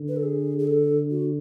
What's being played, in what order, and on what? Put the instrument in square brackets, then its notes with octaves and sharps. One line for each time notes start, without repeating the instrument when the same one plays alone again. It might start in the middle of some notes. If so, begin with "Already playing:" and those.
Already playing: [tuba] D3
[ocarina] B4
A4
G#4
G#4
A4
F#4